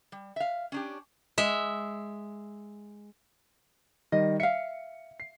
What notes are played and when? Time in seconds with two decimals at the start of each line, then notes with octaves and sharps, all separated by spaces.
0.12 G3
0.36 E5 F5
0.72 C#4 D4 G4
1.38 G#3 E5
4.12 D#3 G3 D#5
4.40 E5 F5 C#7
5.20 C7